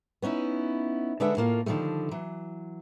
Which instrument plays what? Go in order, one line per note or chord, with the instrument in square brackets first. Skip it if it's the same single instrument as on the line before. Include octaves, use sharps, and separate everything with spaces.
[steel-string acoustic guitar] B3 C#4 D#4 E4
D3 G#3 D4 B4 E5 F#5
A2 A#3 F4
D3 D#3 F3 G3 A3
E3 F#3